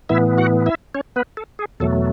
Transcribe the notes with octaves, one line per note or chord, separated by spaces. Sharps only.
A2 E3 B3 E4 E5
F#4 F#5
E4 E5
C#4 C#5
B3 B4
A4
G#4
E2 B2 F#3 A3 A4